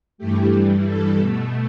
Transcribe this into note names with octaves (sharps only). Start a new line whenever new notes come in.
G2 E3 A3 G4
G2 E3 G3
G2 E3 G3 A4
B2 A3